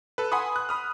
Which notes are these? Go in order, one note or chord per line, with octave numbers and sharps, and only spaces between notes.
A4 B4
F#5 G#5 B5 C6 D#6
F#6
B5 D#6 F6